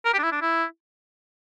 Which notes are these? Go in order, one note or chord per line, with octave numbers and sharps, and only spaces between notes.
A#4
G4
D4
E4
D4
E4